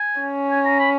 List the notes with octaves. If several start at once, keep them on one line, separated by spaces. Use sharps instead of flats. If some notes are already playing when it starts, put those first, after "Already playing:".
Already playing: G#5
C#4
G#5
A#5
B5